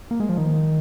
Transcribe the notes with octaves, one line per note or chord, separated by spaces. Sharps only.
A#3
G#3
F3
D#3